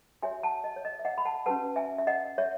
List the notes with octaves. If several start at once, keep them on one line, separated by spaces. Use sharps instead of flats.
F#4 C#5 E5 G#5
F#5 A5
D#5
C#5
D#5
E5
D#5 F#5
B5
F#5 A5
C#4 F#4 B4 F#5 A5
E5 G#5
E5
D#5 F#5
C#5 E5